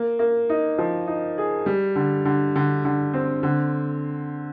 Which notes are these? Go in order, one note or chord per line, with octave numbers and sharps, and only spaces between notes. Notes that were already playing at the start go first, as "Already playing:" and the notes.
Already playing: A#3
A#3
D#4
F3
D#4
G#4
G3
D3
D3
D3
D3
C4
D3